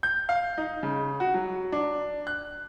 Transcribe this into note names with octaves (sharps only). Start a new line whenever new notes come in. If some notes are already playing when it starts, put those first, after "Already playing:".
G6
F5
D#4
C#3
F#4
F#3
D4
F#6